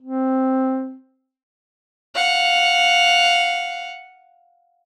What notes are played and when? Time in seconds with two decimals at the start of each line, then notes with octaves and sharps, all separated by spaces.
0.02 C4
2.16 F5 F#5